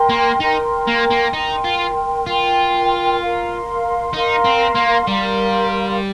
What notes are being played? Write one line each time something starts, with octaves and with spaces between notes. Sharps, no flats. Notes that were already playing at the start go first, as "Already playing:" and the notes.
Already playing: A#4 G5 C6
A#3
D#4 A#4 G5 C6
A#3
A#3
D#4 A#4 G5 C6
F4
F4 A#4 G5 C6
A#4 F5 C6
D#4 A#4 F5 C6
C4
A#3
G3 A#4 F5 C6